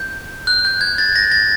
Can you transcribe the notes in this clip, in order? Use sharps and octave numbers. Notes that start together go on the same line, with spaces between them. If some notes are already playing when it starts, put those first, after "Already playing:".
Already playing: G6
F#6
G6
G#6
A6
A#6
A6